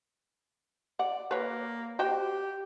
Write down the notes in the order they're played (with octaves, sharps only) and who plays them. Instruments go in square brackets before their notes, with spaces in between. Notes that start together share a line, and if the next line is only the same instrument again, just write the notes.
[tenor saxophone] D5 [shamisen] F#5
[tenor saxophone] A#3 [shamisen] B4 C#5
[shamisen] F#4 C5 G5 [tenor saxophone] G4